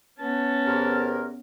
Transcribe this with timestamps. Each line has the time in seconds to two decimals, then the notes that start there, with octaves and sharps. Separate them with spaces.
0.19 B3 C#4 A5
0.66 E2 C3 A#4